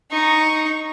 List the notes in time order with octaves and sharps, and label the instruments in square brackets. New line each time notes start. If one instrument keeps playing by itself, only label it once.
[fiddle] D#4 C#6